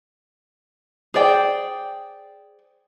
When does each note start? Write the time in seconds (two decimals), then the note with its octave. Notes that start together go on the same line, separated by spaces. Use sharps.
1.14 G#4 C5 D5 G5